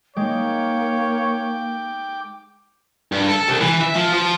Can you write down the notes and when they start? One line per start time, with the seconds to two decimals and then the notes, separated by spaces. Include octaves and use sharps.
0.17 G#3 A#3 D#4 C#5 G5 D6
3.12 G2
3.28 A4
3.48 C2
3.61 E3
3.81 E5
3.96 F3
4.13 F3